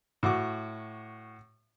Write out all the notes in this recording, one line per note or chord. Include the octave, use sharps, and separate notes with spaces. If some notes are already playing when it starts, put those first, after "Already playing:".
A2 F#4 F#5 D6